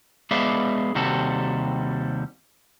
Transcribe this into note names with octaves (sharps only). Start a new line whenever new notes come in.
G#3 B3 G#4 D5 E5 F5
D#2 C3 G3 F#4 A4